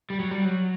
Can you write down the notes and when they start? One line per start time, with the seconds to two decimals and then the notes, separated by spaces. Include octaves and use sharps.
0.10 G3
0.20 F#3
0.31 G3
0.45 F#3